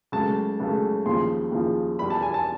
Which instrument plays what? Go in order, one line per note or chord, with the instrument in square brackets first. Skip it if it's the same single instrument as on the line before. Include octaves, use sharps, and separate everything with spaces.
[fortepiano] C#2 C#3 F#3 A3 A5
C#2 C#3 F#3 A3
D#2 C#3 F3 C6
D#2 C#3 F3
E2 B2 G3 B5
A5
G#5
A5